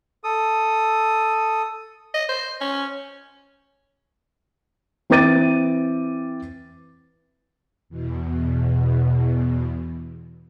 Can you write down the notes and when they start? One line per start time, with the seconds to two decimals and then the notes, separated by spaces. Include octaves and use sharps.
0.24 A4 D#6
2.14 D#5
2.29 C5
2.61 C#4
5.10 E3 C4 B4 D6 A6 D#7
7.89 E2 B2